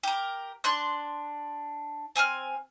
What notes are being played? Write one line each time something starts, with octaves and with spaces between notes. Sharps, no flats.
G4 A#4
D4 C6 F#6
C4 G#5 A5 F6